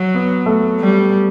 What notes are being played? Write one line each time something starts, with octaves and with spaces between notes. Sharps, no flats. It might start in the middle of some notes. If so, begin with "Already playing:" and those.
Already playing: F#3
B3
A3
G3